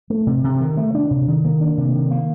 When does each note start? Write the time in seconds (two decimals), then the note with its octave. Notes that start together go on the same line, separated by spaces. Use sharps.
0.10 A3
0.27 C3
0.44 C3
0.60 D#3
0.77 A3
0.95 D4
1.10 C3
1.28 D#3
1.45 A#3
1.61 D4
1.77 C3
1.94 D#3
2.11 A#3